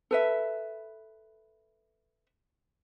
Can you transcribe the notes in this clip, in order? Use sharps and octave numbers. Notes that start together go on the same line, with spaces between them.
A4 B4 E5